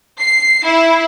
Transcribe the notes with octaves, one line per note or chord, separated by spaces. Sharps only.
C7
E4